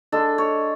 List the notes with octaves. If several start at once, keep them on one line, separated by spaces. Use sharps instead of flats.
G#3 D4 A4
C#5